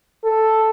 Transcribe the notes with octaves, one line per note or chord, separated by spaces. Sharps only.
A4